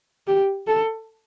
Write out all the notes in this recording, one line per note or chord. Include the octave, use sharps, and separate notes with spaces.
G4
A4